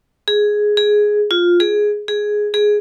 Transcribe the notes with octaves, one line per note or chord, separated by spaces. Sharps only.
G#4
G#4
F4
G#4
G#4
G#4